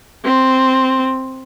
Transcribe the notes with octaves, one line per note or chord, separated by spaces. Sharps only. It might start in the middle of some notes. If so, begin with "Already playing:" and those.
C4